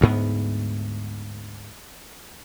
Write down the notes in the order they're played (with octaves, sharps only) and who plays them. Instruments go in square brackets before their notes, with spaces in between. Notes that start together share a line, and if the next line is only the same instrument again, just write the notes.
[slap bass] D2 G#2 B3